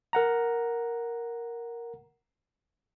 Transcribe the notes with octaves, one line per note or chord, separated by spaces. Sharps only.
A#4 F#5 A#5